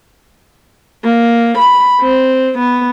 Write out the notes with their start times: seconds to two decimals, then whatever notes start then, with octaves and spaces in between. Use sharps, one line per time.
1.04 A#3
1.58 B5
2.01 C4
2.58 B3